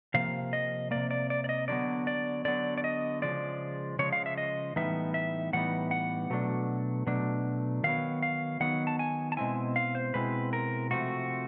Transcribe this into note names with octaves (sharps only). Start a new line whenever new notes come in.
C3 F3 A#3 F5
D#5
C3 F3 A#3 D5
D5
D5
D5
D#5
D3 F#3 B3 D5
D5
D3 F#3 B3 D5
D5
D#5
C#3 F3 G#3 D5
C#3 F3 G#3 C#5
F5
E5
D#5
A2 E3 G3 B3 D#4 E5
E5
A2 E3 G3 B3 D#4 F#5
F#5
B2 F#3 A3 D4
B2 F#3 A3 D4
D#3 F#3 B3 F5
F5
D#3 F#3 B3 F#5
A5
G#5
A5
B2 G#3 C4 E4 G#5
F5
C5
B2 G#3 C4 E4 B4
A#4
C3 F3 A3 F#4